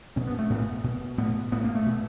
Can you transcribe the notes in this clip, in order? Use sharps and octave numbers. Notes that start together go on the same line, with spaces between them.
B2 C#4
B3
A3
A2 B3
B2
A2 B3
A2 B3
A#3
A3
B2